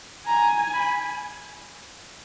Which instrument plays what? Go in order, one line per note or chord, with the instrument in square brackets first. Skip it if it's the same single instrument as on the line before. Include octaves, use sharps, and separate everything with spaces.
[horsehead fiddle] G#5 [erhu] A#5
[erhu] B5